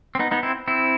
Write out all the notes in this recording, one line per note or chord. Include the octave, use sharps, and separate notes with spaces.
C4
B3 D#4
B3 D#4
C4 E4
C4 E4